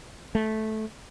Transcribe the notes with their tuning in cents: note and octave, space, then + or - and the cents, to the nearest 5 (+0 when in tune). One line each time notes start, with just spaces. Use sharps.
A3 -10